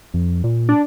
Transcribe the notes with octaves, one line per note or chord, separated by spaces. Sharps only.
F2
A#2
D4